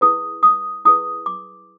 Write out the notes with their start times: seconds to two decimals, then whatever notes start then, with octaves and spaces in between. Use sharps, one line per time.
0.01 E4 G#4 B4 D#6
0.43 D#6
0.85 E4 G#4 B4 D#6
1.26 D6